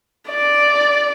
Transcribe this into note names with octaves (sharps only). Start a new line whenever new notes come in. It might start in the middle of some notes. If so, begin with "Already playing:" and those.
D5